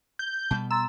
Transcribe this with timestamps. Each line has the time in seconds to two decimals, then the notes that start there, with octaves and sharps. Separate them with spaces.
0.19 G6
0.51 B2 G3 B3 A5
0.71 A#5 C6 E6 A6